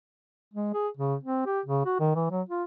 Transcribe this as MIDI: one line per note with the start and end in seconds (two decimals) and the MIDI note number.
0.54 0.71 56
0.73 0.88 68
0.97 1.15 49
1.23 1.45 60
1.46 1.61 67
1.66 1.85 49
1.85 1.98 66
2.00 2.12 51
2.15 2.26 52
2.31 2.42 54
2.49 2.64 65